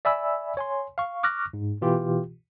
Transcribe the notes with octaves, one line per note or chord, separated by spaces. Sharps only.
D5 E5 G#5 B5 E6
C#5 G#5 C6
F5 C#6
C#6 D6 F6 F#6 A#6
G#2
B2 E3 F4 G4